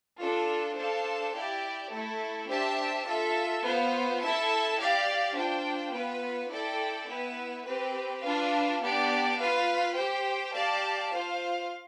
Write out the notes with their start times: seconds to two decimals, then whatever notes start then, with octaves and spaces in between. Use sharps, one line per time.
0.20 D4 F4 A4
0.76 D4 A4 C5 F5 A5
1.34 E4 G4 D5
1.91 A3 E4 A4
2.49 D4 G4 C5 E5 A5
3.06 F4 A4 E5
3.63 B3 F4 C5 F5
4.21 E4 A4 E5 A5
4.78 G4 D5 F5
5.36 D4 F4 C5 G5
5.93 B3 F4 B4
6.51 E4 A4 D5 G5
7.08 B3 E4 B4
7.65 C4 G4 B4
8.23 D4 F4 B4 F5
8.81 B3 D4 G4 D5
9.38 F4 B4 F5
9.95 G4 C5 G5
10.53 G4 D5 F5 A5
11.10 F4 C5 F5